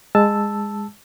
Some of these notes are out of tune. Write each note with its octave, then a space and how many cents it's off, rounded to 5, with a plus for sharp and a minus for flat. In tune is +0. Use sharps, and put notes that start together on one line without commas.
G#3 -15 A5 +0 E6 +0